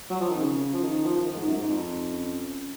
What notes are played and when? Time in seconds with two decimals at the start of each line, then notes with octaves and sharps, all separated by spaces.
0.10 F#3
0.21 F3
0.30 D#3 C4
0.41 C#3 C#4
0.73 F3
0.83 D#3
1.05 F3
1.16 F3
1.26 D#3 D#4
1.36 G#2
1.47 F#2
1.57 G#2
1.69 F2
2.10 C#4